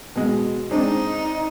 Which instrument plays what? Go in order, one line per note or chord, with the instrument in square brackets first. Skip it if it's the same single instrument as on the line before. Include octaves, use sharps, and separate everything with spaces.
[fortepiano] B2 G#3
[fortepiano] G#3 C4 D4 [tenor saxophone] D#4